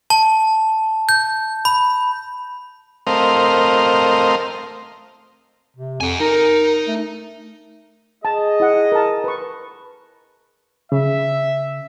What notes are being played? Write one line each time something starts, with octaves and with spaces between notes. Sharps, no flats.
A5
G6
B5
A3 C4 A#4 C5 D#5 F5
C3
F2 F#5 G#5
D#4 A#4
A3
G#4 D#5 A5
E4 F#5
A#4 A5
B4 C#6
C#3 E5